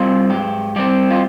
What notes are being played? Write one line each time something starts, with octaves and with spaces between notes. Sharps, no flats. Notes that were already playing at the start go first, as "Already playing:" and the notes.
Already playing: G3 C4 F4
G#2 G4
G3 C4 G4
F4